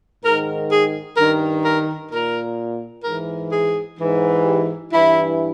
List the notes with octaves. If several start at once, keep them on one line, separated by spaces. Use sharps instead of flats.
G#2 D#3 A#4
G#4
G2 D#3 A#4
A#4
A#2 A#4
G#2 E3 A#4
G#4
G#2 E3
G4
G2 E3 E4